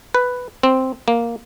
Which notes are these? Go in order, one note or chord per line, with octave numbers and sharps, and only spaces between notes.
B4
C4
A#3